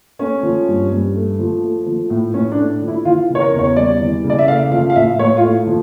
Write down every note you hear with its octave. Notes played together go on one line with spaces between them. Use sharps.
A3 C#4
F3
G2
G2
A3
F3
A3
F3
A2
A2 C#4
D4
A3
F3
E4
E3 F4
C#3
C#5
A#4
E2
C#5
G3 D5
E3
C#3
D5
E5
A3 F5
F3 F5
F5
A2 E5
A2 C#5
F4
A3
F3